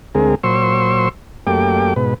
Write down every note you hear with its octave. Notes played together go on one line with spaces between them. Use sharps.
D2 G#3 C4 G#4 A#4
A#2 F#3 C5 C6 C#6 E6
F#2 A3 A#3 G4 G5 D6
G#2 B2 B4